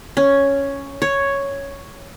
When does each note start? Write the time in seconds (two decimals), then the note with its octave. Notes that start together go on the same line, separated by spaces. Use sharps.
0.17 C#4
1.02 C#5